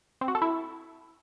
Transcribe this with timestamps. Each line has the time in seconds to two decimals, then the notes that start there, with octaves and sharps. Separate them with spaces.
0.21 C4
0.28 F#4
0.35 A4
0.42 E4